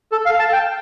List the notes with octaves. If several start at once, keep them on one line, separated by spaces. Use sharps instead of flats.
A4
F5
A5
G5